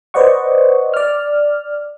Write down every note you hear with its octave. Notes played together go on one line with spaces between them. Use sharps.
B4 C5 D5 D#5 F#5 C#6
D5 F6